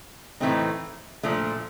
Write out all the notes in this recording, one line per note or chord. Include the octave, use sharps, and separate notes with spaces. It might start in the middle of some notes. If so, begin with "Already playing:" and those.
A2 E3 A3 C4 D#4
A#2 F3 A3 D4